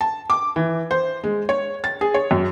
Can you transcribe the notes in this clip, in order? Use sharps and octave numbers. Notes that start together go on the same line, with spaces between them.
A5
D6
E3
C5
G#3
C#5
A6
G#4
C#5
F#2